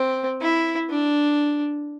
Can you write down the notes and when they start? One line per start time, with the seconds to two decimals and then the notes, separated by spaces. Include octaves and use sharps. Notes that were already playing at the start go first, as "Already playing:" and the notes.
Already playing: C4
0.41 E4
0.91 D4